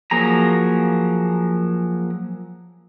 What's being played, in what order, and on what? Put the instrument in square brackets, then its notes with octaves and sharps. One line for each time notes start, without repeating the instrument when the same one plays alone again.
[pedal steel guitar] F3 F#3 A#3 G#4 A#5